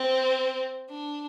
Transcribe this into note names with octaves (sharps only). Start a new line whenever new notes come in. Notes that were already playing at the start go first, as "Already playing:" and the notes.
Already playing: C4
D4